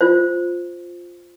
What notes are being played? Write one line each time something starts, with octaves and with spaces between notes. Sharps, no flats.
F4 C5